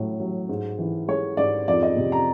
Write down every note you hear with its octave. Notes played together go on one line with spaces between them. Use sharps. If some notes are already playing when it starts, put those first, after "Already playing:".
Already playing: A2 F#3
F#3
G#2
E3
G#3 C#5
G#2 D5
F2 D5
D#5
C3
A#5